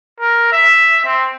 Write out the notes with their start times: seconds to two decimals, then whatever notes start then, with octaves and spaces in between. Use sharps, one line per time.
0.20 A#4
0.52 E5
1.05 C4